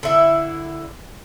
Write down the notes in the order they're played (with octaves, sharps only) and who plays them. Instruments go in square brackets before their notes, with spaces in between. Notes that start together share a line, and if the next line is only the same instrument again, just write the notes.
[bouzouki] D3 E4